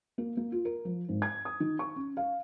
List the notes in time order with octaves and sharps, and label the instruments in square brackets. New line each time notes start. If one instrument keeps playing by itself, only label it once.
[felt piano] A#3
A#3
F4
A#4
F3
G#1
G#6
D#6
D#3
C#6
C#4
F5